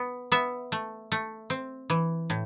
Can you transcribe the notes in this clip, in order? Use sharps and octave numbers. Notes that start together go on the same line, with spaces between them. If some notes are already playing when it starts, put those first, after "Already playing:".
Already playing: B3
B3 E5
A3
A3
C4
E3
A2